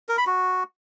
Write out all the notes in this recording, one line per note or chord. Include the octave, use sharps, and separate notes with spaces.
A#4
B5
F#4